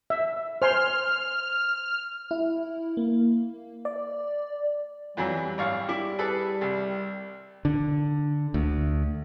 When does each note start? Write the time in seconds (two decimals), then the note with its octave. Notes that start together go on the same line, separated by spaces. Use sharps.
0.10 E5
0.62 C5 G#5 C6 F6
2.31 E4
2.97 A#3
3.85 D5
5.17 F2 E3 F#3 G3
5.58 G#1 C#5 F5
5.89 E4 D6
6.19 G#4 A4 B4
6.61 C2
7.65 D3
8.54 D2